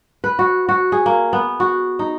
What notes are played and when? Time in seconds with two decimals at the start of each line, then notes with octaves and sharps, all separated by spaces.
0.24 B4
0.39 F#4
0.69 F#4
0.92 G#4
1.06 A#3
1.33 B3
1.60 F#4
1.99 D#4